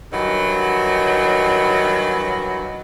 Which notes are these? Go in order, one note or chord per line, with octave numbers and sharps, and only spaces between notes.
G2 D#3 E3 F#3